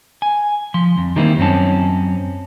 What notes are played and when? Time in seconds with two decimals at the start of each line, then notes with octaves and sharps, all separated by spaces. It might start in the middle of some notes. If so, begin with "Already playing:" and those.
0.22 G#5
0.74 F3 C6
0.98 F2
1.16 D#3 G3 A#3 C4 D#4 E4
1.38 F#2 C4 C#4 A5